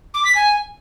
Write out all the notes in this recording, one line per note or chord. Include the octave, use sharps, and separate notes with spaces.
D6
B6
G#5